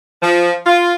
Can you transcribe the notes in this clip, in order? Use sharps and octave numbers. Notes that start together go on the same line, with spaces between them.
F3
F4